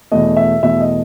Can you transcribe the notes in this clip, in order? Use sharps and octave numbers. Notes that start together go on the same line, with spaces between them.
E2 B2 A3 D#5
E5
E2 B2 A3 E5
D#5